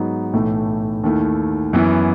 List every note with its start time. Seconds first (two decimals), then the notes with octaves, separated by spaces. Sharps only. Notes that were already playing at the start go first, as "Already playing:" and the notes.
Already playing: G#2 F#3 B3 D#4
0.33 B1 A2 E3 A3
1.04 D#2 D#3 A3 E4
1.73 F#2 E3 B3 E4